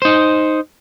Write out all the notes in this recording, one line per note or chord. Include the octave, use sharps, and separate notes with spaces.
D#4 C5